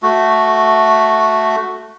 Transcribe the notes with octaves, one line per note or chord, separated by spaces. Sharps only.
A3 F#4